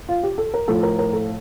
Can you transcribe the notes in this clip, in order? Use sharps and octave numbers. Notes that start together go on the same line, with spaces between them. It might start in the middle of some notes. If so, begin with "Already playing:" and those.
F4
G4
A4
A#4
A2 F3 A4
A#4
A#4
A4